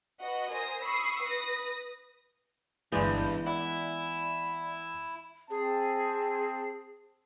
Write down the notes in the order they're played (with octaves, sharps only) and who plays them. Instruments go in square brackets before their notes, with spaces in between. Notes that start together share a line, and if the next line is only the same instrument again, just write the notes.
[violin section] F#4 B4 D#5 F#5
A#4 C5 G#5 D#6 A#6
B5 C#6 D#6 E6 C7
B4 D#6 A#6
[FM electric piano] G1 D5 G6 [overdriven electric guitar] G2 [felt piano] E3 [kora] G#3 B3
[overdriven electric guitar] E4 [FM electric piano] D5 E5 F#5
[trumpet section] C4 A5 [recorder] G#4